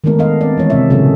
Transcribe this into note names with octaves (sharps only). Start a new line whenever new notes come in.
D#3 G#3 A3 B3 D4 A#4
B3 D4 D#5 F5
C4 D5
E3 G#3 C#5
C3 C4 E5
A#2 C#3 F#3 G#4 A4